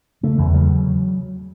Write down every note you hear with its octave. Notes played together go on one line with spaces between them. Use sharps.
C#3 A3
E2 E3
C#3 F#3